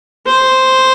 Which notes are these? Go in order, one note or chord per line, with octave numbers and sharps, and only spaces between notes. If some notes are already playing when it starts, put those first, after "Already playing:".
C5